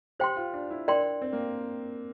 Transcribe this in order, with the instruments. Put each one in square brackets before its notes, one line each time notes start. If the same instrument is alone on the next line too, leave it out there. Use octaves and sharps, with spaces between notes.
[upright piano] G4 [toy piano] C5 G5 C6
[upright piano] F4
D4
E4
[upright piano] D4 [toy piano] A#4 D5 G5 C6
[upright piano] C4
A#3